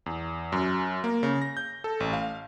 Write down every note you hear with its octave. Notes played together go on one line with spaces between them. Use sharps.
E2
F#2
A#3
C#3
A#6
G6
A4
A1
F5